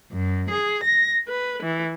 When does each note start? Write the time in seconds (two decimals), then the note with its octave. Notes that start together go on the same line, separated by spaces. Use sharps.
0.12 F#2
0.50 G#4
0.83 A#6
1.28 B4
1.62 E3